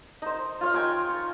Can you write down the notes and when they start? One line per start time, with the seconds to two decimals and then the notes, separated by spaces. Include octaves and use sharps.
0.22 D#4 C5
0.61 F4 C#5 F5
0.73 D#4 G5 G#5 C6
1.08 C#6